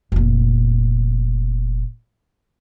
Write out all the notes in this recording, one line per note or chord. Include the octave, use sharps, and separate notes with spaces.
F1 A#2